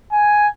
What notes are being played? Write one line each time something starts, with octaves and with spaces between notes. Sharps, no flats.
G#5